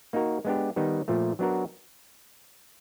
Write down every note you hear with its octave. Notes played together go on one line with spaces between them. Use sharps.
A#3 D#4 F#4 A#4
G#3 B3 D4 G4
D#3 G3 B3 D#4
A#2 F3 A3
F#3 B3 D4 F#4 A#4